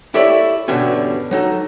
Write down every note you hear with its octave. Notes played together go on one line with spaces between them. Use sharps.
E4 G4 A4 C#5 D5 E5
E2 G2 B2 D3 G3 C#4
F#3 D#4 A4